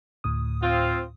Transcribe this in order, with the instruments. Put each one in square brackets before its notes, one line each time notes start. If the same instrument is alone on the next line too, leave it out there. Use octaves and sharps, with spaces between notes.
[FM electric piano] D2 A2 D#6
[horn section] C4 F4